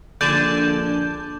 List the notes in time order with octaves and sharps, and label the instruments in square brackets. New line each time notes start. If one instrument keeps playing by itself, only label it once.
[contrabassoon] A#1 [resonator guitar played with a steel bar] D3 [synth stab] D5 G#5 A5 [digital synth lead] G6